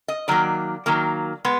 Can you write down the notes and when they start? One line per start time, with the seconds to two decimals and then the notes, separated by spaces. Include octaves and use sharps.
0.08 D#5
0.28 D#3 F#3 A#3 D5
0.86 D#3 F#3 A#3
1.45 G#3 B3